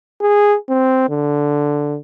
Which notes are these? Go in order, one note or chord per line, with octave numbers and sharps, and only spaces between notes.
G#4
C4
D3